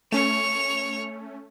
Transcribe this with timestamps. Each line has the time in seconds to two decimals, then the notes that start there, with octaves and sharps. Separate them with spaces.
0.12 A3 C#4 C#5 F7